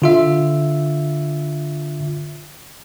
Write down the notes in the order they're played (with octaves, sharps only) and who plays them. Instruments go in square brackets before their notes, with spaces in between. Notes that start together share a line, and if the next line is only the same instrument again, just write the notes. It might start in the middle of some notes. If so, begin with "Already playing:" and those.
[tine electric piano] D3 F4 E5